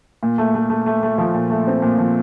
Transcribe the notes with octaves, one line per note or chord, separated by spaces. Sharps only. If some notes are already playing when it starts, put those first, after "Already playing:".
A#2
A3
A3
A3
A3
A3
F3
A#2
A3
C4
A#2
F3